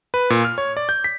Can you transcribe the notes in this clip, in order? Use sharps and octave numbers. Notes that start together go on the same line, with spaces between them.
B4
A#2
F6
C#5
D5
G6
B6